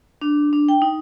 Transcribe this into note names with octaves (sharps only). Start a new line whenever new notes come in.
D4
D4
G5
D#4